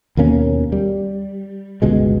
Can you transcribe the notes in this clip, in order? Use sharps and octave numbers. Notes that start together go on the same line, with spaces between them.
D#2 B2 A#3 C#4
G3
G1 C#2 B2 G#3